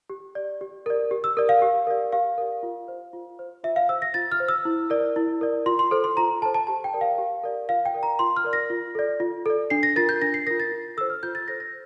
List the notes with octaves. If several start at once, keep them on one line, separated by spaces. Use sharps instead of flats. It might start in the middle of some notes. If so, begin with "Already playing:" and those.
G4
D5
G4
A#4 D5
G4
E6
A#4 D5
F5
G4
A#4 D5
G4 F5
A#4 D5
F4
C5
F4
C5
F4 E5
F5
C5 E6
A#6
F4 A6
F6
C5
E6
E4
A#4 D5
E4
A#4 D5
F4 C6
C6
A4 C5
C6
F4 A#5
A4 C5 A5
A5
G4 A5
G5
A#4 D5
F5
G4
A#4 D5
F4 F5
G5
A#4 D5
A#5
F4 C6
F6
A#4 D5
A#6
F4
A4 D5
F4
A4 D5
D4 C7
A#6
F4 A#4 A6
G6
D4 A#6
C7
F4 A#4 A#6
A6
F4
A4 C5 E6
F6
F4 G6
A6
A4 C5 A#6
A#6